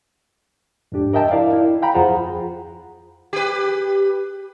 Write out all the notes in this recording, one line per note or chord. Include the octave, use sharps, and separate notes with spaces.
F2 G#2 D4 G4
A#4 D#5 E5 G5 A5
E4 A#4 D5 F5
E4
F5 G5 A#5 B5
F2 F4 G#4 C5 F#5 A#5
G4 B4